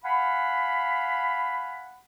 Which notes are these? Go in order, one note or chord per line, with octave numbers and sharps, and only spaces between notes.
F5 F#5 G#5 B5